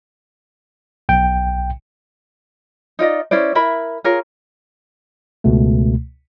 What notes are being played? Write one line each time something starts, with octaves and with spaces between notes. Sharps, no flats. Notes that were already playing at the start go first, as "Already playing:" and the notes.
B1 G5
D#4 F4 D5 D#5
C#4 E4 C5 D5
E4 A#4 E5 B5
F4 G#4 A#4 C#5
C#2 B2 A3